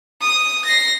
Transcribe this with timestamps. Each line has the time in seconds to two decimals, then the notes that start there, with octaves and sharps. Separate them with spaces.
0.21 D#6
0.65 A#6 C7